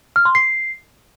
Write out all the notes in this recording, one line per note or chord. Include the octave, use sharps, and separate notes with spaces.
F6
C6
C7